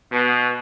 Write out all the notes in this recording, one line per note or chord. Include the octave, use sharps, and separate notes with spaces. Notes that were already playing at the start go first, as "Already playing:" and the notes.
B2